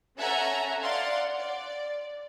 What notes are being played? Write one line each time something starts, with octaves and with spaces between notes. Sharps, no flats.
C#4 A4 E5 F#5 G#5 A#5
D5 F5 F#5 C6
D5